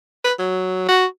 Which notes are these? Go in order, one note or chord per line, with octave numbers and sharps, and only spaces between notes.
B4
F#3
F#4